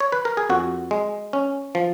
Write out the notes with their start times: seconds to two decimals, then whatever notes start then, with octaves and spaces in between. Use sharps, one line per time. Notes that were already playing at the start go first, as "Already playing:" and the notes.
0.00 C#5
0.12 B4
0.25 A#4
0.37 G#4
0.49 F2 F#4
0.91 G#3
1.33 C#4
1.75 F3